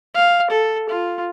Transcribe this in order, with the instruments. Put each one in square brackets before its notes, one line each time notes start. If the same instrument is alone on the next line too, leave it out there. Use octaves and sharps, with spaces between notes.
[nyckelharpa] F5
A4
F4